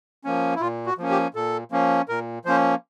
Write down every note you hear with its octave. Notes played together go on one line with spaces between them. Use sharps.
F3 A#3 C#4
E4
A#2 F4
F#4
F3 A#3 C#4
G4
A#2 A4
F3 A#3 C#4
A#2 A#4
F3 A#3 C#4 C5